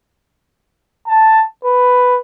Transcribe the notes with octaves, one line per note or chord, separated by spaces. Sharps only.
A5
B4